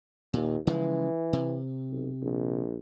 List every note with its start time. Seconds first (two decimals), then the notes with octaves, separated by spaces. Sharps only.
0.34 D#2 A#2
0.67 C#3 E3 F3 G#3
1.33 C3
1.90 B1
2.22 A#1